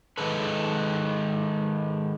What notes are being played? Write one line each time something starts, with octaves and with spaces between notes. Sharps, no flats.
D#3 G#3 A4 B4